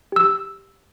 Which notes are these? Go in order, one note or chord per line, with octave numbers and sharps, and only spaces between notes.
G4 E6